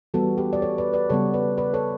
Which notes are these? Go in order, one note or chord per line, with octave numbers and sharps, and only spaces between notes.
E3 G3 B3 F#4 A4
G4 B4
D5
A4 C#5
B4 D5
B4 D5
C#3 G3 B3 A4 C#5
B4 D5
B4 D5
A4 C#5